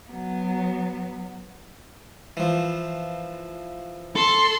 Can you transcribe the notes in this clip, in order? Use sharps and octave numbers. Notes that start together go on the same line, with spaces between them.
F#3 B3
E3 F3
A4 C6